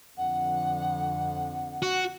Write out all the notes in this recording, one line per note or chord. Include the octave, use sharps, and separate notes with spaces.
F2 D3 F#5
F#4